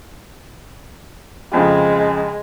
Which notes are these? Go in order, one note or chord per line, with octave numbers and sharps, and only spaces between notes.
F2 C#3 G#3